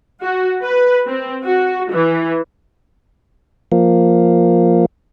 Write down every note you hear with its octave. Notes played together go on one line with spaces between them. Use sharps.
F#4
B4
C4
F#4
E3
F3 A#3